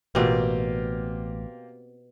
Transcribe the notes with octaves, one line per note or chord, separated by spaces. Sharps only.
A1 B2 A#3 C4 F4 G4